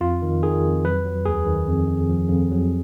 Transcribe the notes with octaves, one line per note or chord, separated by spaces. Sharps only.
F2 F4
D#3
D#3 G#4
F2
F#3 B4
F#3
D#2 G#4
D#3
F2
F2
F3
F2
F#3